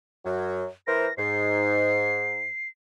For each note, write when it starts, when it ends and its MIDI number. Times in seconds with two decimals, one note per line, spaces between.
0.25 0.66 42
0.25 0.66 54
0.87 1.07 52
0.87 1.07 70
0.87 1.07 72
0.87 1.14 94
1.18 2.45 44
1.18 2.68 96